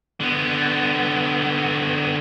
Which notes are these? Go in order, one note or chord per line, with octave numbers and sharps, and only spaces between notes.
D3 B3